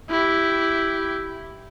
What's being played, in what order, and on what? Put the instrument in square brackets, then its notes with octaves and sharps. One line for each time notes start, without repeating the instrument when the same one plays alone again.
[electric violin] E4 G4